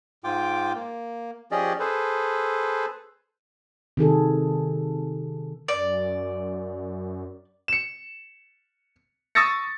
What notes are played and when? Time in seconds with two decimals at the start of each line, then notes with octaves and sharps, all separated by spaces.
0.24 G#2 F4 G5 D6
0.75 A#3
1.51 F3 C#4 G4 G#4 D5 D#5
1.80 G#4 A4 B4 C5
3.97 C3 D#3 G#4 A4
5.68 F#2 D5
7.68 C#7 E7
9.35 C#6 D#6 E6 A6 A#6 C#7